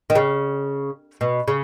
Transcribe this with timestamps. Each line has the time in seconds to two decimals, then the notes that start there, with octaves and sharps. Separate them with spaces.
0.10 D#3
0.15 C#3
1.21 B2
1.48 C#3